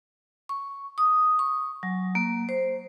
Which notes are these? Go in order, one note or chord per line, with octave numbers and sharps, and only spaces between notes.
C#6
D#6
C#6
F#3
A#3
C5